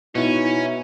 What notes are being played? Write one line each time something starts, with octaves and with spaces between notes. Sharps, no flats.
B2 C#4 D#4 E4